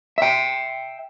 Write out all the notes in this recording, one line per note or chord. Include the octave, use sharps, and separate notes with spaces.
E5 G5